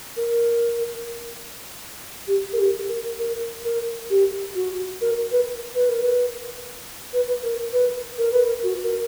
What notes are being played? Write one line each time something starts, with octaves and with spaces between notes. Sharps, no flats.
A#4
G4
A#4
G4
A#4
A#4
A#4
G4
F#4
A#4
B4
B4
A#4
B4
B4
B4
A#4
B4
A#4
B4
A#4
F#4
A#4